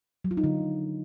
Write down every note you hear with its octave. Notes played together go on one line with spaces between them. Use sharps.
F#3
F4
D#4
D3